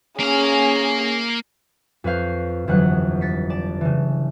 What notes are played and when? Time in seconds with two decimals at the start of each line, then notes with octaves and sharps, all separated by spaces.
0.20 A#3 C#4 G#4 F5
2.04 F2 B4 C#5 F5 G6
2.67 G1 F2 E3 F#3 F#5 F#6
3.21 A6 B6 C#7
3.50 D5 A5
3.81 C#3 E3